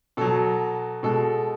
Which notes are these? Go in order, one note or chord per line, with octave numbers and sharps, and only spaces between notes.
B2 F#3 A4
B2 G#3 A4